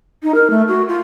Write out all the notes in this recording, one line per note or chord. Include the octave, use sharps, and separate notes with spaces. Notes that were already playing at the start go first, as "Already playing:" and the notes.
D#4
A#4
A3
F#4
F4